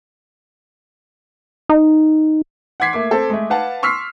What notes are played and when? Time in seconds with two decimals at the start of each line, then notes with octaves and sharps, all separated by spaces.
1.69 D#4
2.80 F#5 C6 D6 G#6 B6 C7
2.93 A3 A#3 D6
3.11 C4 A4
3.30 G#3 A3
3.50 B4 F5 F#5 A5
3.83 C6 C#6 E6 F6 B6 C7